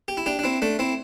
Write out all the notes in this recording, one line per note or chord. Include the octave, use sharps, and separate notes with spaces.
G4
E4
D4 G4
D4
C4 E4
A3 D4
C4 E4